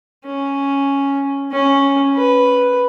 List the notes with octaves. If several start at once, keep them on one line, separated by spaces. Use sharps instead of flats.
C#4
C#4
B4